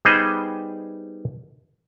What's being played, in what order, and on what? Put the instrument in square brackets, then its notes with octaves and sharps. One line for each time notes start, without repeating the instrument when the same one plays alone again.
[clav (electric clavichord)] G3 B3 D#4 G#4 C5 D#5